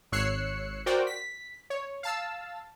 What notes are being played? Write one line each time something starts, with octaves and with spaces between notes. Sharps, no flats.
G#1 C#5 E6 F#6 C7 C#7
F#4 A#4 C5 D5 G5
B6
C#5
F5 A5 E6